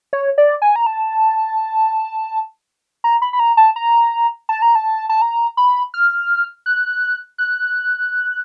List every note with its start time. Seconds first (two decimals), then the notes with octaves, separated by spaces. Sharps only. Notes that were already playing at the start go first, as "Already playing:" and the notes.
0.13 C#5
0.38 D5
0.62 G#5
0.76 A#5
0.86 A5
3.04 A#5
3.22 B5
3.33 B5
3.39 A#5
3.57 A5
3.76 A#5
4.49 A5
4.62 A#5
4.75 A5
5.09 A5
5.22 A#5
5.57 B5
5.94 F6
6.66 F#6
7.38 F#6